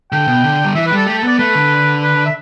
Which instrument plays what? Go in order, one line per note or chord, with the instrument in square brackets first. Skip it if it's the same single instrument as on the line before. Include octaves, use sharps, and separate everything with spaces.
[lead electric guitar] D3 [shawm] G5
[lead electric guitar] B2
D3
G3
[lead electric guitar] E3 [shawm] E5
[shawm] B4
[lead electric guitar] G3 [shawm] A4
[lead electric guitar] A3 [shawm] G4
[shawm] A4
[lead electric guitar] B3 [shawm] D5
[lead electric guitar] A3 [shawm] B4
[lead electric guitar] D3
[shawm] B4
E5